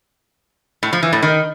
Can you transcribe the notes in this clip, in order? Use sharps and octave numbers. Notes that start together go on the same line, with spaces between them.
A2
F3
E3
A2
D#3